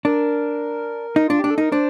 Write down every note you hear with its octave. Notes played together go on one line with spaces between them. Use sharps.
D4 A#4
D#4
D4 F4
D4 G4
A4
D#4 A#4
D4 C5